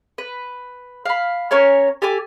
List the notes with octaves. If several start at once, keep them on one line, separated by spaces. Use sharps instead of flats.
B4
F5 B5
C#4 A#4 C#5 G#5
G4 A4 G#5 D6